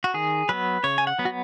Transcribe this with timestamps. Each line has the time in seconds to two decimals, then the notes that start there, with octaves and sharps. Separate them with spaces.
0.04 F#4
0.14 D#3 G#4
0.49 F#3 B3 B4
0.84 C#3 C#5
0.98 G#5
1.07 F#5
1.19 F#3 B3
1.25 F#4